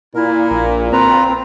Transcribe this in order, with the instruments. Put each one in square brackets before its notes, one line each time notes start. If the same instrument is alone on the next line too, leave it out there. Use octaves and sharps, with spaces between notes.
[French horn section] A#2 [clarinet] E4 [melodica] A#4
[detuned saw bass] A#1
[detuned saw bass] C4 [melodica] F4 B4 [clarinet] A#5